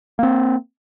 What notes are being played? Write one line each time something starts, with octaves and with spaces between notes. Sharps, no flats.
A#3 C4